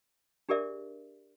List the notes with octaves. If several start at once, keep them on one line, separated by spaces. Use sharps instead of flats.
D4 G4 G#4 A#4 D5 E5